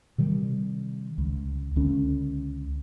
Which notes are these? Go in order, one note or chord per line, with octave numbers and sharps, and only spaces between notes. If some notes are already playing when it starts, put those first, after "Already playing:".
C3 D#3 G3
C#2
C#2 D3 C#4